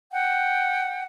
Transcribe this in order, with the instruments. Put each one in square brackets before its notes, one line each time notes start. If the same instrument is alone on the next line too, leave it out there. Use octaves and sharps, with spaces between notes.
[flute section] F#5 G5